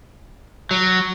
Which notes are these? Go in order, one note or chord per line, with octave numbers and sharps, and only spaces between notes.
F#3